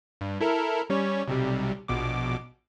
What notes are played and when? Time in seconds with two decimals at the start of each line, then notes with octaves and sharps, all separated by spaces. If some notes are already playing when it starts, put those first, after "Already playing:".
0.21 G2
0.40 E4 A4 A#4
0.90 G3 C#4 C#5
1.28 B1 C3 G3
1.88 A#1 B2 D6